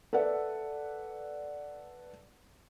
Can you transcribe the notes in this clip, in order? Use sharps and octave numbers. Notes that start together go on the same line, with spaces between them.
A4 B4 D5 E5 F#5